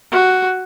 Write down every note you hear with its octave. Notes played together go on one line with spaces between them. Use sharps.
F#4